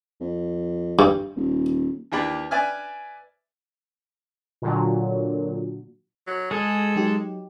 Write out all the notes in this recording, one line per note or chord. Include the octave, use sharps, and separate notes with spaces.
F2
G2
D#1
D#2 E3 A#3 D4 G4 B5
B4 D5 E5 G#5 F6
A#2 D3 F#3
F#3
G#3 G#4 A4
F#3 D#4 G4